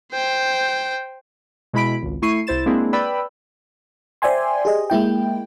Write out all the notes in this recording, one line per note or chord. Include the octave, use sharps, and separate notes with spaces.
C5 G5
B2 G#3 E4 B5 B6 D7
G#1 C#2
A3 E4 C#6 C7 D#7
C2 E4 C5 A6 E7
G#3 A#3 C4 D4 E4 G#4
B4 D5 G5 B5 E6
C5 D5 E5 G5 G#5 C6
G4 G#4 D#5
G#3 A#3 E4 G5